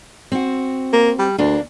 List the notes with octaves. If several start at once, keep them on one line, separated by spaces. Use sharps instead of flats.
C4 F#4
A#3
G3
D2 A#3 D4